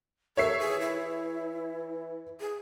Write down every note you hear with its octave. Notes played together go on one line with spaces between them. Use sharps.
D#2 A4 C#5 E5 C7
E3 G#4
E4
G#4